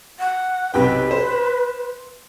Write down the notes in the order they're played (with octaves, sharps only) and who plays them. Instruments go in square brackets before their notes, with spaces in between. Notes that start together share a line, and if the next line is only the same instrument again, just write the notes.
[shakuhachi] F#5
[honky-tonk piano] B1 C3 G5 [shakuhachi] B4
[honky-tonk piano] C5